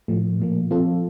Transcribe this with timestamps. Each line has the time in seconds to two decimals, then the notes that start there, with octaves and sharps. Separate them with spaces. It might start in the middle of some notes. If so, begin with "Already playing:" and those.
0.08 A2 F3 A3
0.40 A#2 F3 A#3
0.71 F3 C4 F4 A4